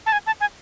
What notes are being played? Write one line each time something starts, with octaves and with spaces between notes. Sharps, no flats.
A5
G#5
A5
G#5